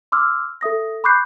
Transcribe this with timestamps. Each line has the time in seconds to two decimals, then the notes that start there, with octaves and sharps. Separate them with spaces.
0.12 C6 D6 E6 F6
0.61 A4 E5 D#6 A#6
1.04 B5 C#6 D6 F#6 G6 C7